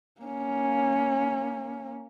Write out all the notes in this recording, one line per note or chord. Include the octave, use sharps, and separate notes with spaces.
A#3 C#4